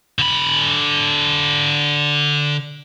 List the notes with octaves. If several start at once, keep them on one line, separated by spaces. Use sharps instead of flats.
D3 B5